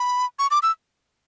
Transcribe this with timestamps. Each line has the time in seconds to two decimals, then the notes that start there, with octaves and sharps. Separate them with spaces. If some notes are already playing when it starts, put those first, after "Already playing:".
Already playing: B5
0.39 C#6
0.51 D6
0.62 E6